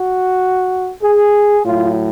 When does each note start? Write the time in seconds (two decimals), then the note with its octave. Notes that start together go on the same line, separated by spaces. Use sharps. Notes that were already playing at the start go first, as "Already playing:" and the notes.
Already playing: F#4
1.03 G#4
1.64 A2 F#3 F4